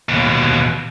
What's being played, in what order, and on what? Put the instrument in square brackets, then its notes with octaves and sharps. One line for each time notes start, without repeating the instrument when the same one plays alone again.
[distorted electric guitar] D#2 B2